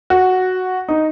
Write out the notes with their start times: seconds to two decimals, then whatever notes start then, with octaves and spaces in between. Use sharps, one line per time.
0.10 F#4
0.88 D#4